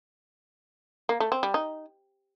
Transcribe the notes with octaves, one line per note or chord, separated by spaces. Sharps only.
A#3
A3
C4
G3
D#4